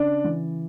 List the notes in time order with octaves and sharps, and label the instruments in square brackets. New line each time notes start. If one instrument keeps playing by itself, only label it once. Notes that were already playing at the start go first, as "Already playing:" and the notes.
Already playing: [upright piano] C#3 D4 D5
E3